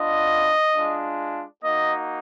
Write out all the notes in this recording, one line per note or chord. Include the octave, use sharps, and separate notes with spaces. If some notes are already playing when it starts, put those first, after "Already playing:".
Already playing: B3 D4 F4 D#5
G#3 D4 F4
A#3 D#4 F#4 D#5